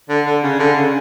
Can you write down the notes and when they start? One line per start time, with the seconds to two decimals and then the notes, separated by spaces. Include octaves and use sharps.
0.09 D3
0.26 D3
0.43 C#3
0.59 D3
0.76 C#3